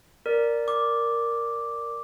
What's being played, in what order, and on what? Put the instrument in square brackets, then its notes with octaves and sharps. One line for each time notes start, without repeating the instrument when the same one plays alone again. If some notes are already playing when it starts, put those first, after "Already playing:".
[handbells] A#4 D5
[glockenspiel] D6